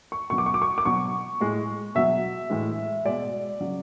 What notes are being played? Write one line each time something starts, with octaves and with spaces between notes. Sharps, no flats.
C#6
B2 F#3 C#6
D6
C#6
D6
C#6
D6
B2 F#3 C#6
A2 G#3
B2 F#3 E5
A2 E3 G#3
B2 G#3 D5
C#3 F#3